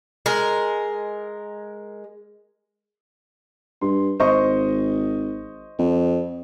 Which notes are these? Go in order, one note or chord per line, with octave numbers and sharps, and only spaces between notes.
G#3 A#4
G2 C6
G#1 C5 D#5 C#6
F2